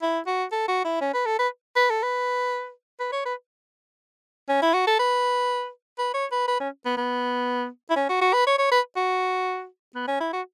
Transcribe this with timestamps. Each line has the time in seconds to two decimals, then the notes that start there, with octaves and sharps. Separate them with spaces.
0.02 E4
0.27 F#4
0.52 A4
0.68 F#4
0.85 E4
1.01 C#4
1.14 B4
1.26 A4
1.39 B4
1.76 B4
1.90 A4
2.03 B4
3.00 B4
3.12 C#5
3.26 B4
4.49 C#4
4.62 E4
4.74 F#4
4.87 A4
4.99 B4
5.99 B4
6.14 C#5
6.32 B4
6.48 B4
6.60 C#4
6.85 B3
6.97 B3
7.90 E4
7.96 C#4
8.09 F#4
8.22 F#4
8.34 B4
8.47 C#5
8.59 C#5
8.72 B4
8.96 F#4
9.95 B3
10.08 C#4
10.20 E4
10.33 F#4